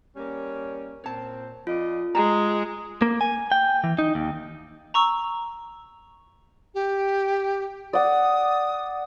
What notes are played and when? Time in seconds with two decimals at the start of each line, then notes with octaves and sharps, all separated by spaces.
0.16 G3 A#3 C#4
1.04 A#2 C4 C#5 A5
1.67 F2 F4 D5 D#5
2.15 G#3 G#4 A#5
3.02 A#3
3.21 G#5
3.52 G5
3.84 E3
3.99 D#4
4.15 D#2
4.94 A#5 C#6 E6
6.75 G4
7.93 D5 F#5 D#6